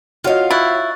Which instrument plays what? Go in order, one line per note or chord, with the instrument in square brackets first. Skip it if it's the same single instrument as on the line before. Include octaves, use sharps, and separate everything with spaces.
[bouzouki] F4 F5 [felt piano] F#4 C#5 D#5
[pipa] E4 [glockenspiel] C#6 F#6 A6